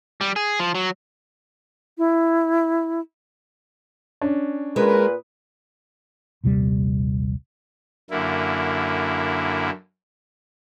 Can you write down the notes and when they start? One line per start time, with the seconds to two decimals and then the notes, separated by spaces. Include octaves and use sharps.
0.21 G3
0.36 G#4
0.60 F3
0.75 F#3
1.98 E4
4.21 C#4 D4
4.76 A#2 G#3 A#4 B4
6.44 A#1 D#2 C3 G3
8.10 F#2 D3 A#3 E4